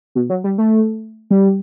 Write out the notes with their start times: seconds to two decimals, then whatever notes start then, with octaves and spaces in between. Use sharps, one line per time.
0.15 B2
0.30 F#3
0.44 G3
0.58 A3
1.31 G3